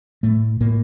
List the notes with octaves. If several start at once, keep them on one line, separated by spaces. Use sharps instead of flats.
A2 A3
A2 A#3